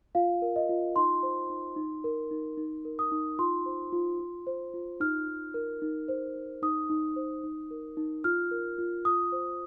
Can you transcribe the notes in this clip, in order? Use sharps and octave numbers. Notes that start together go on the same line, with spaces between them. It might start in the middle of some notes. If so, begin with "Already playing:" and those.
F4 F5
A#4
D#5
F4
D#4 C6
C5
D#4
D#4
A#4
D#4
D#4
A#4
D#6
D#4
F4 C6
C5
F4
F4
C5
F4
D#4 F6
D#4
A#4
D#4
C5
D#4
D#4 D#6
D#4
C5
D#4
A#4
D#4
F4 F6
A#4
F4
F4 D#6
C5